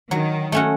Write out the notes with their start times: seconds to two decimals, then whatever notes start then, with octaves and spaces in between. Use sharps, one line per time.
0.11 D#3 F#3
0.52 A3 C#4 F#4